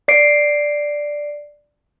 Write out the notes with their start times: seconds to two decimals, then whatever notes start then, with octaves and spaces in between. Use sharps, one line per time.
0.08 D5 C7 D7